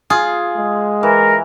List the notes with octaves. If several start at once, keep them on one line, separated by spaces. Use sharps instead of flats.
F4 G#4
G#3
E3 A#4